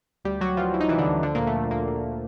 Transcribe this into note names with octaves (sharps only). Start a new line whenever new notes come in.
D2 G3 G4
D2 F#3 F#4
E3 F3 F4
E3 E4
D#4
C3 E3 E4
D3 D4
D2
D3 F3 D4
D2 A#2 A#3
A3
F3
D2 A#2 A#3
D3